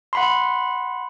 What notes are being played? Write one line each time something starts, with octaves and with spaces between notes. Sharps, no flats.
F#5 B5 C6